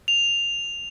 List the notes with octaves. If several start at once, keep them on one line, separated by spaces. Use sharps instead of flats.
F7